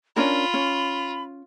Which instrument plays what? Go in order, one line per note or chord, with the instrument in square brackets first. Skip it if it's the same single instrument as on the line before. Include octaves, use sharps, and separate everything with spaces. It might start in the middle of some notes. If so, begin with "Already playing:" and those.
[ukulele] C#4 D4 A#4 [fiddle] F4 [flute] B5
[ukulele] C#4